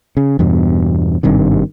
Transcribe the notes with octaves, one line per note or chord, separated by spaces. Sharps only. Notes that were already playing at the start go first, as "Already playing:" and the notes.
C#3
E2 G2 B2
G#1 G2 C3 D#3